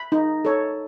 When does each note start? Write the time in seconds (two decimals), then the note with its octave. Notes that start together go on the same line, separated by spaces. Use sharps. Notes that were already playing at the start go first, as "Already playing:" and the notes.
Already playing: B5
0.12 D#4
0.45 A4 C#5